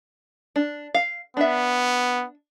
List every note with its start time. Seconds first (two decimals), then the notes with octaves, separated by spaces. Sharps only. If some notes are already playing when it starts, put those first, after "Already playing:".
0.56 D4
0.94 F5
1.37 B3 D4 E5